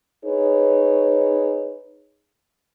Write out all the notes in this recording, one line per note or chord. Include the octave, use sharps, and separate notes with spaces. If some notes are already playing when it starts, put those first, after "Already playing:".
D#4 G#4 B4 C#5